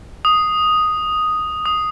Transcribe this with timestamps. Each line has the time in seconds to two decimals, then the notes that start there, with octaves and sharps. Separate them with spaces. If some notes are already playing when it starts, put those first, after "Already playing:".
0.25 D#6
1.66 D#6